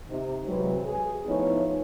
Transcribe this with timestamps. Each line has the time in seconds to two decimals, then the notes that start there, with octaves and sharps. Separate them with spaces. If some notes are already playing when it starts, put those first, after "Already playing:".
0.10 C3 D#4
0.46 C3 E3 F#3 G#3 C4 B4
0.85 G#4
1.26 F3 A3 B3 D#4 E4 C#5